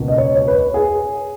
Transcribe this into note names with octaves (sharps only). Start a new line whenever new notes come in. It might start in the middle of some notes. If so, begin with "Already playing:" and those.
Already playing: C#2 B2 A#3
D#5
C#5
C#5
B4
C#5
G#4